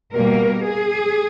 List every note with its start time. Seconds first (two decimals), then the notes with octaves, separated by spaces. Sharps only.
0.13 B2 G3 A#3 A#4
0.64 G#4